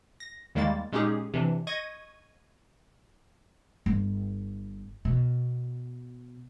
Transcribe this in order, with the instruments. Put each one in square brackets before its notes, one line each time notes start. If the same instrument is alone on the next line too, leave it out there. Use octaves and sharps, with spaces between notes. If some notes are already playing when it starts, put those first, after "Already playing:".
[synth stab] A#6
D#2 D#3 G3 G#3 A#3 A6
A#2 G#3 C#4 D#4 G4 G#4
C3 E3 D4
D#5 C#6 G#6 A#6 D#7
[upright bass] G1
B2